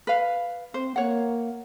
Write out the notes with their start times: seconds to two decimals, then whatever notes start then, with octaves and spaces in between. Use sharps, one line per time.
0.07 B4 F5
0.74 C4 C5
0.96 A#3 C#5 F#5